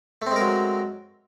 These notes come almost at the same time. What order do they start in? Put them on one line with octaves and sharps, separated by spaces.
A3 C4 G#3 A#4 F#3